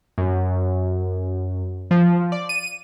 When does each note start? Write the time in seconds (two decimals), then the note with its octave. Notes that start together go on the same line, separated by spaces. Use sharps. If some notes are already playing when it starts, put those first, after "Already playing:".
0.18 F#2
1.91 F3
2.32 D5
2.49 D#7